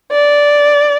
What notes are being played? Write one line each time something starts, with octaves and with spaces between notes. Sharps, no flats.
D5